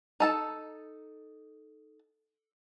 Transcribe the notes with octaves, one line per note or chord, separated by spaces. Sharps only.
D#4 A4 A5